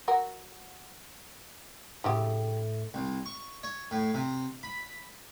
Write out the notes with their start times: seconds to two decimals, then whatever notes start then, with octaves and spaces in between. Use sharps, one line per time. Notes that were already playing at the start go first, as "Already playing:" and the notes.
0.08 F#3 F#4 A#4
2.04 A2 C#3 A3 G4
2.94 C2
3.26 C#6
3.63 C#5
3.91 A2
4.14 C3
4.63 B5